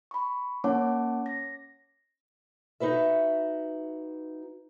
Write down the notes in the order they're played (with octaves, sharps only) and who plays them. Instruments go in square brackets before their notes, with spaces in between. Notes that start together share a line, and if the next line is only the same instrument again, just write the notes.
[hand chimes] B5 C#6
A#3 C#4 C#5 F#5 A5 D6
A#6
[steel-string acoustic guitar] D#4 F#4 B4 E5